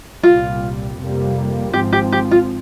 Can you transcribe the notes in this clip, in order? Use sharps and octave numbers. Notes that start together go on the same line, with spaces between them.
C2 A#2 G3 F4
F2 C3 G3 A#3
G#1 G#2 F3 C4 G4
G4
G4
F4